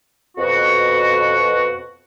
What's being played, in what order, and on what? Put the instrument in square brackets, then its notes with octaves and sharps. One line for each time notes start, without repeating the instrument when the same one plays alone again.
[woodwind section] F2 B2 F#4